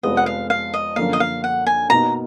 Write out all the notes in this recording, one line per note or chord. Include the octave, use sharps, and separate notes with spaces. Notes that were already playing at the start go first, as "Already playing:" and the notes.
F1 F2 F3 G#3 B3 D#5
F#5
F5
F5
D#5
F#2 D3 F3 A#3 F5
D#5
F5
F#5
G#5
B2 A#3 D#4 A#5